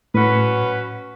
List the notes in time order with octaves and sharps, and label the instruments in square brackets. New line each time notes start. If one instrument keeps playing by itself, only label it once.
[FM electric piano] A2 [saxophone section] F#3 C#4 F#4 B4